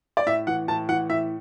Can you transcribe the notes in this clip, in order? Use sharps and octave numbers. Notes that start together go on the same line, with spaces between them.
D5
A2 E5
E3 F#5
A2 A5
E3 F#5
A2 E5